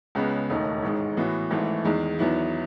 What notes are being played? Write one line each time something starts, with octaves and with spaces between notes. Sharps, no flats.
C#2 C#3 G#3 B3
E1 D#2 D#3 A3 D#4
A1 G#2 D#3 G#3
A2 E3 B3 F#4
G#1 G#2 E3 A3
E2 D#3 G#3
E2 D#3 F#3 B3 E4